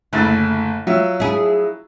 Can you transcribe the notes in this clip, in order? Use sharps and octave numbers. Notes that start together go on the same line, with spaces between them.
F#1 D2 E4 A6
F#3 F4 E5
E4 G#4